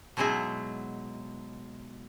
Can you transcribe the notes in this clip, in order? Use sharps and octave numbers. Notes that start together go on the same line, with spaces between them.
B2 F#3 G#3 D#4 E4 G#4